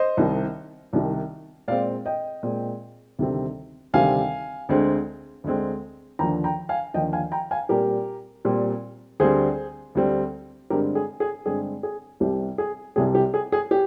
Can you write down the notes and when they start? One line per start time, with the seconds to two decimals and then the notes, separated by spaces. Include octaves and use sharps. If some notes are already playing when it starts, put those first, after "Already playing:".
Already playing: C5 D#5
0.17 C2 C3 D#3
0.93 C2 C3 D#3
1.68 A#2 G#3 C4 D5 F5
2.06 D#5 G5
2.43 A#2 G#3 C4
3.19 D2 C3 D#3 G3 C4
3.93 D2 C3 D#3 G3 C4 F5 G#5
4.69 D2 D3 G#3 C4
5.44 D2 D3 G#3 C4
6.19 D#2 D3 F3 G5 A#5
6.44 G5 A#5
6.69 F5 G#5
6.94 D#2 D3 F3 D#5 G5
7.13 F5 G#5
7.32 G5 A#5
7.51 F5 G#5
7.69 A#2 G3 C4 G4 A#4
8.45 A#2 G3 C4
9.20 D2 D3 G3 C4 G#4 C5
9.95 D2 D3 G3 C4
10.70 G2 D3 G#3 C4 G4 A#4
10.95 G#4
11.20 G#4
11.46 G2 D3 G#3 C4 G#4
11.83 G#4
12.20 C2 C3 G3 C4 G4
12.58 G#4
12.96 C2 C3 G3 C4 G#4
13.15 G4
13.34 G#4
13.52 G#4
13.71 G4